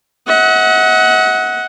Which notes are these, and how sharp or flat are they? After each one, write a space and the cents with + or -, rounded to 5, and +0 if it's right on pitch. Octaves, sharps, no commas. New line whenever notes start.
D#5 +45 F#5 +0